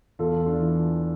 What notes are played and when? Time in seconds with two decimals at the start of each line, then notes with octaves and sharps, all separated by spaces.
0.19 E2 F4 A4
0.46 D4 F4
0.60 E3